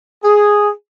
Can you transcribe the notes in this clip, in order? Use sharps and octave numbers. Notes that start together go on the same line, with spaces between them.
G#4